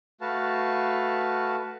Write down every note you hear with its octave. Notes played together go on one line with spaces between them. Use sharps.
A3 F#4 B4 F5 A5